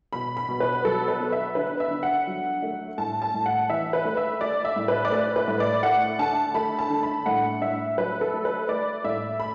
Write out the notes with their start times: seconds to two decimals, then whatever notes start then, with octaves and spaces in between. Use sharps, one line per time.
0.13 B2 B5
0.37 B5
0.49 B2
0.60 B4
0.84 F#3 A4
1.08 B4
1.20 B3
1.32 E5
1.55 D3 B4
1.80 E5
1.91 D3
2.03 F#5
2.27 F#3
2.62 A3
2.98 A2 A5
3.22 A5
3.34 A2
3.46 F#5
3.70 E3 E5
3.93 B4
4.05 A3
4.17 E5
4.41 A3 D5
4.65 E5
4.76 A2
4.88 B4
5.05 D5
5.12 A3 B4
5.36 B4
5.48 A2
5.60 D5
5.83 A3 F#5
6.19 D3 A5
6.54 A3 B5
6.79 A5
6.90 D3
7.03 B5
7.26 A2 F#5
7.62 A2 E5
7.98 F#3 B4
8.21 A4
8.34 A3
8.45 B4
8.68 A3 D5
9.04 A2 E5
9.40 B5